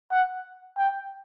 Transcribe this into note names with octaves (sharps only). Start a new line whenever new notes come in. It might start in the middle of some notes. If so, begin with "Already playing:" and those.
F#5
G5